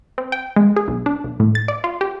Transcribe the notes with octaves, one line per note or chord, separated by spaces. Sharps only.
C4
G5
G#3
G#4
B1
D4
B1
A2
A6
D5
F4
G4